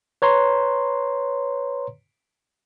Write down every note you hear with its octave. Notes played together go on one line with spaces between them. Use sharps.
B4 C#5 A#5 C6